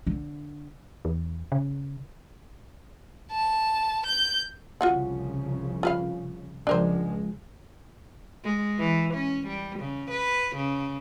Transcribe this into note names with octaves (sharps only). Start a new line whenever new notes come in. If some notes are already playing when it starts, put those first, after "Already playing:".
D3
E2
C#3
A5
G6
C2 C#3 F3 F4 F#4 F#5
F4 B4 F5
C#2 F3 G#3 D4 A#4 C5
G#3
E3
C#4
G3
C#3
B4
C#3